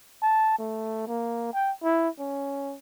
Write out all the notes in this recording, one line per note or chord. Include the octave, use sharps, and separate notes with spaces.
A5
A3
A#3
G5
E4
C#4